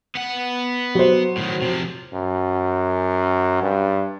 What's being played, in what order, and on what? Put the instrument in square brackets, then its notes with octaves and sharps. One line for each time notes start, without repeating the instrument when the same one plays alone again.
[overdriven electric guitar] B3 F#5
[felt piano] F#3 C5
[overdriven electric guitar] A2 D#3
C3 F3
[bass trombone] F#2
G2